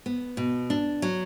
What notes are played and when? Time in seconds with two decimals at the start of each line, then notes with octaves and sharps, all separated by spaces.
0.06 B3
0.37 B2
0.70 D4
1.02 F#3